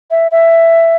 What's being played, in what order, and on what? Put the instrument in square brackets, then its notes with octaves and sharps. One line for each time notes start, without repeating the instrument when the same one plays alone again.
[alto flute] E5
E5